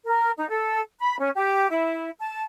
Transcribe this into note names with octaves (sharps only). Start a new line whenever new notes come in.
A#4
D#4
A4
B5
C#4
G4
E4
A5